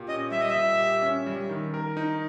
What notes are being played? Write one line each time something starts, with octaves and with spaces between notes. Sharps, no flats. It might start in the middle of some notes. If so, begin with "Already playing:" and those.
Already playing: A#2 G4
C#4 D#5
G3 E5
D#5
E5
A#2
G4
C#4
G3
D#3
A#4
D#4